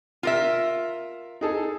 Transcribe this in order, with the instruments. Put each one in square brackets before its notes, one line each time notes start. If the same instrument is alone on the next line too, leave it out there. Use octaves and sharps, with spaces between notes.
[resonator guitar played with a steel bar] F4 A#4 E5
[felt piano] D#4 G#4 A4